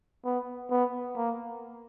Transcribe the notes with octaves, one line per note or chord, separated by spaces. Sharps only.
B3
B3
A#3